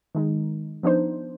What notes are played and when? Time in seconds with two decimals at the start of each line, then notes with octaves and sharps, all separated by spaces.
0.15 D#3 G#3 D#4
0.83 F3 B3 D4 D#4 C5